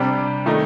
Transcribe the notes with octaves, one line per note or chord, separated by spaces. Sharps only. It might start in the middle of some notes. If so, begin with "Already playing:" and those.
Already playing: C3 G3 D4 G4
D#3 A3 D#4